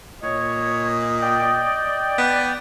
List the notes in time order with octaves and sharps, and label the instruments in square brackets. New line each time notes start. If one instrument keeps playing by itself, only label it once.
[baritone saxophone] A#2 [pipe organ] C#5 [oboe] D#5
[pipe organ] D5 G5
[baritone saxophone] B3